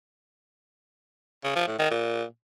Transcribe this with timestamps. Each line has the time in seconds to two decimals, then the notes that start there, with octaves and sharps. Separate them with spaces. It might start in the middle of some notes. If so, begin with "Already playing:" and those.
1.44 C#3
1.56 F3
1.67 A2
1.79 D#3
1.91 A#2